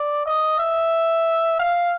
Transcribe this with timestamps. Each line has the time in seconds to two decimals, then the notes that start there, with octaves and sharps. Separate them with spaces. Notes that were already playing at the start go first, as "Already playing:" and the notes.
Already playing: D5
0.26 D#5
0.58 E5
1.59 F5